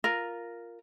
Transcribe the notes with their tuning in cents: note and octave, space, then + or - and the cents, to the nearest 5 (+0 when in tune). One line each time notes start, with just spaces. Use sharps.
F4 +0 A#4 +0